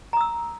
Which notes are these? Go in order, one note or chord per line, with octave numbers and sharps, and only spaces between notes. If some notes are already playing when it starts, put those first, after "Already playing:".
A#5 D#6 E6